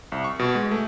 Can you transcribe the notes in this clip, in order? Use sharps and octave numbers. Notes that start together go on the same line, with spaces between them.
C2
C#6
B2
G#3
A3